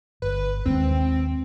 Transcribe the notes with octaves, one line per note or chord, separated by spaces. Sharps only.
G1 B4
D#2 D#3 G#3 C4